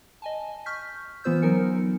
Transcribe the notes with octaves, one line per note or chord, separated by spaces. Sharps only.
D#5 G#5 A5
C#6 F6 G6 B6
E3 B3 F4 C5 E6 G6
F#3 B3 D#4 A#4 G#5 C#7